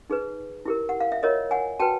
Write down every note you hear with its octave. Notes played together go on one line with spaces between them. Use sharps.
D#4 G#4 B4
E4 G4 A#4
F#5
F5
E5
F4 A#4 C#5 D#5
F#5 G#5
F#4 B4 G5 A5